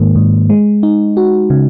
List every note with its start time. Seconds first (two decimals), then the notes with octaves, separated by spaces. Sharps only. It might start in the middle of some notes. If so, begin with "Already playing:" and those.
Already playing: G#2 D#3 A#3
0.16 G#2
0.50 G#3
0.83 D#4
1.17 F#4
1.50 C#3